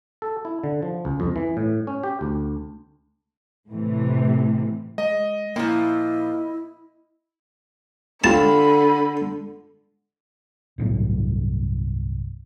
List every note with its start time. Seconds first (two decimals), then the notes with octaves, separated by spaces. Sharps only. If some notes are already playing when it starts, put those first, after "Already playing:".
0.22 A4
0.45 E4
0.64 D3
0.82 F3
1.05 C#2
1.20 F2
1.36 E3
1.57 A2
1.87 C#4
2.03 G4
2.21 D2
3.69 A2 C3 E3
4.98 G#3 D#5
5.56 A#2 F3 A#3 E4
8.24 D3 F4 G4 A5 B5
10.78 G1 C2 A2 F#3